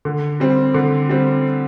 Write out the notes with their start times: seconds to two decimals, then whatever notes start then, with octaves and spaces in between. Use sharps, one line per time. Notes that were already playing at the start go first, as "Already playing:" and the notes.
0.05 D3
0.40 G3 C4
0.74 D3
1.09 G3 C4